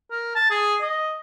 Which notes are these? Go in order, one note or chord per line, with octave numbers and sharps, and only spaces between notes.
A#4
A5
G#4
D#5